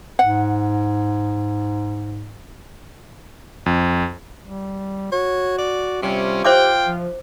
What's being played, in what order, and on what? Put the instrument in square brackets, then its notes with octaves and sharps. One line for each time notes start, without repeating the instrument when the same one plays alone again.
[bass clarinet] G#2 [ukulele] F#5
[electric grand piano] F2
[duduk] G3
[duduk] F#4 [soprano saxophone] C#5
[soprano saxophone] D5
[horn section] C3 C#4 [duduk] G3 [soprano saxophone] F4
[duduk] G4 [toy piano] C5 E5 D6 [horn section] F5 G5
[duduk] F3